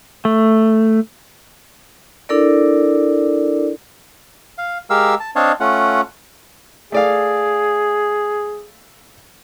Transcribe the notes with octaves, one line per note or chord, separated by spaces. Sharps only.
A3
D4 E4 A4 A#4 D5
F5
G#3 G4 A#4 F5 E6
A5
C4 D4 C#5 D#5 F5 A5
A3 C#4 F4 F#5
A3 G#4 D5 F5